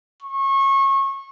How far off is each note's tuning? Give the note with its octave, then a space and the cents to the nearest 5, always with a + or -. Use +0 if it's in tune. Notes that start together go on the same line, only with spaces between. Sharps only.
C#6 -30